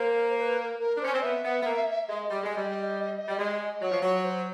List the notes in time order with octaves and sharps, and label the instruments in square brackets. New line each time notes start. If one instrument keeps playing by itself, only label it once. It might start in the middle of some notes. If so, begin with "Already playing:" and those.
Already playing: [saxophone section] A#3 [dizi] C5
[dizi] C5
B4
A#4
A#4
[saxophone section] D4
[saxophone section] C#4 [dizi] C5
[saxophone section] C4
[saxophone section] B3 [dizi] E5
[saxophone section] B3
B3
A#3
[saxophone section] G#3 [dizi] D#5
[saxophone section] G3
G#3
G3
G3
G#3
[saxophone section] F#3 [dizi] C#5
[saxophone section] F3
[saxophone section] F#3 [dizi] C#5
[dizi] C5